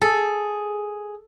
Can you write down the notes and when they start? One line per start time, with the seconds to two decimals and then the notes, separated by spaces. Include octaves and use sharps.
0.02 G#4 A4